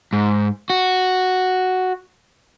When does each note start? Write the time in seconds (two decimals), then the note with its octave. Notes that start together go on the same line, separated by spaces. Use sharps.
0.13 G#2
0.70 F#4